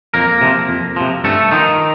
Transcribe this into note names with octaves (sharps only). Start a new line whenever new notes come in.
F2 A#3 A#4
C3 F3
F2
C3 F3
G2 A3 A4
D#3 F3 D#4